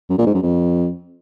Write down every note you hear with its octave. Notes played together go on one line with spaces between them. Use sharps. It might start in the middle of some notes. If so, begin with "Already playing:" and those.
F#2
A#2
G#2
F#2
F2